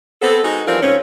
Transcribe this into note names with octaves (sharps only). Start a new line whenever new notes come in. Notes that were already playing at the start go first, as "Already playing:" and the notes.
B3 C4 A4
G#3 D#4 F#4
E3 F3 G3 C4 F4 A#4
G#2 C#3 C4 C#4